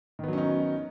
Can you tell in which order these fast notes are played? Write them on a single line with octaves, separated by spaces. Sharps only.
D#3 B3 F#3 C#4 D#4